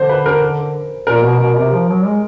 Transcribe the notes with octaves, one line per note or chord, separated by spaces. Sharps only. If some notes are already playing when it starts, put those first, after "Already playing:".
Already playing: D3 C5
B4
A#4
A#2 A#4
B2
B2
C3
F3
F#3
G#3